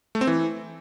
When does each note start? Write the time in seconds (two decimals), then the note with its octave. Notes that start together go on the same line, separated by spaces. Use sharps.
0.15 A3
0.21 C4
0.27 E3